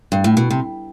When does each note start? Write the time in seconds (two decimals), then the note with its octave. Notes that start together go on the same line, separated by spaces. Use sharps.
0.12 G2
0.24 A2
0.37 B2
0.50 C3